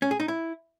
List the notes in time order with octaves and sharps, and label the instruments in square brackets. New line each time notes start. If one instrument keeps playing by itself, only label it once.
[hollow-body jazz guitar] C#4
G#4
D#4
E4